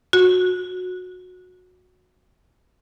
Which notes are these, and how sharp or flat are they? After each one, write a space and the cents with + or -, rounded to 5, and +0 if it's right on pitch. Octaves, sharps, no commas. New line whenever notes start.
F#4 -20